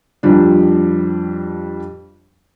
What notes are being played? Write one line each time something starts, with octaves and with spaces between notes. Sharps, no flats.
F2 F3 G3 D4